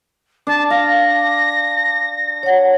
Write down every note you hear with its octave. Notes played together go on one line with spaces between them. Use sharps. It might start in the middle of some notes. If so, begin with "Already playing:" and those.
D4 A5
F5 A#6
C#5 F#5